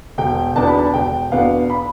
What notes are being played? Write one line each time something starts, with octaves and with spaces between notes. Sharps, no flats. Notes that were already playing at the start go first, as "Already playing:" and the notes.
E1 G5
E2 B2 B3 D4 A5
B5
A5
E1 G5
E2 B2 B3 D4 F5
B5